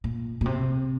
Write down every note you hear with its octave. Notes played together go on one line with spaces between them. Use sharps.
A#2
A#2
C3